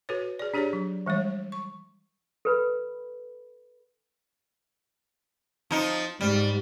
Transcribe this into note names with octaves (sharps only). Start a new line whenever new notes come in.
F#4 A4 B4 C#5
G#4 D5
D4 G4 G#4 C#5 D5 A#5
F#3
E3 G3 G#3 C#5
C#6
A4 B4 B5
F3 D#4
G#2 G3